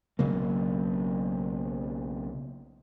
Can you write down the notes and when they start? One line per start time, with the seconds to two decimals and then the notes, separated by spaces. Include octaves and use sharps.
0.19 B1 C#3 F#3 A#3